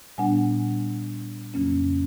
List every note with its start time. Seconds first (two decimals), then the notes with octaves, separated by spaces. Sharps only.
0.18 A#2 G3 B3 D4 F#5 G#5
1.54 F2 C#3 F#3 A#3 C#4